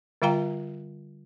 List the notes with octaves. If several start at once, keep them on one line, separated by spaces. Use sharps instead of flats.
D3 G3 F4 F5 G5 A#5